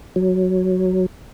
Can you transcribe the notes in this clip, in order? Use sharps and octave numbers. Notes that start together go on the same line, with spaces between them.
F#3